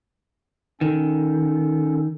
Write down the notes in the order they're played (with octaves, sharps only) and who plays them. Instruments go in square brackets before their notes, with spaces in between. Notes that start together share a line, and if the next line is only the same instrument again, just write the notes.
[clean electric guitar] D#3 [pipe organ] C#4 A4